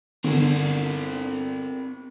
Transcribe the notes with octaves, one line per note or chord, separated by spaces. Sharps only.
G1 D3 C4 A#4